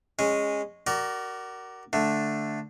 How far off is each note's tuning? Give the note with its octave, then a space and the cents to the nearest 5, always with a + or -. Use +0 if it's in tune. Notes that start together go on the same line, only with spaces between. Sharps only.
G#3 -15 C#4 -10
F#4 +30 A#4 +0 D5 +0
D3 +0 A3 +0